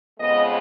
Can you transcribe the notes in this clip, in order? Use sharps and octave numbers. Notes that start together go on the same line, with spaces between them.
F2 C#3 G#3 B3 D#5